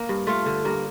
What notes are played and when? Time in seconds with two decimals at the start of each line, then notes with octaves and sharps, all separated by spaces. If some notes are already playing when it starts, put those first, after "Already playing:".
Already playing: A#3
0.09 G2
0.27 A3 F4
0.46 D3
0.65 G2 A#3